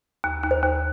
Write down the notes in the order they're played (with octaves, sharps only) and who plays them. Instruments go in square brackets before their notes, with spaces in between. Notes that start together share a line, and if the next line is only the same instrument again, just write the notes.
[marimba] D#2
D#2
[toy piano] C5
[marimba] D#2